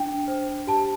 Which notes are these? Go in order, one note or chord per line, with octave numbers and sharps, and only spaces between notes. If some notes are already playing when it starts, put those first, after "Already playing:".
Already playing: D4 G5
C5
G4 A5